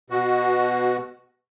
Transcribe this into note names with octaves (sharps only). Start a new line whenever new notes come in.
B2 F#4